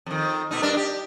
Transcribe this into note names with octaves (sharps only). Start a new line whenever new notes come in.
F2 D#3
B2 A3 D#4
G2 D4 A#4
G4